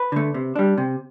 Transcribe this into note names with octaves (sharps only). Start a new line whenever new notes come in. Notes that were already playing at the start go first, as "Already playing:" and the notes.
Already playing: B4
D3 A3
C3
G3 D4
C3